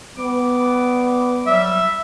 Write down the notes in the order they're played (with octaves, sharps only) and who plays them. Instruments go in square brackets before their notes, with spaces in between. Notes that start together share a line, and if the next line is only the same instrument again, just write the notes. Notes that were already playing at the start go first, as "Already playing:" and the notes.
[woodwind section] G3 D6 [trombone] B3
[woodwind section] F#3 G3 [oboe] E5